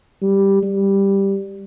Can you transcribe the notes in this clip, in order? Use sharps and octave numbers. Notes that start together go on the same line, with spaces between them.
G3
G3